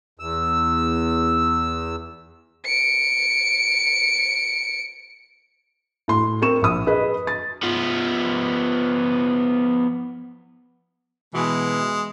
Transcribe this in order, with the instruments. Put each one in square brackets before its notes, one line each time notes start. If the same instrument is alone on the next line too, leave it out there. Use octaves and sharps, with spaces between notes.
[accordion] E2 E6
[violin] C#7 D7
[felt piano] A2 C6
C4 A#4 C#6 E7
A#1 D#6
G#4 B4 D#5
A6
[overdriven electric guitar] F3 B3
[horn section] B2 E3 [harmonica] G#3